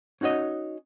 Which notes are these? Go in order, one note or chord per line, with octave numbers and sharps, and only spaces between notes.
C#4 D#4 F#4 C#5 D#5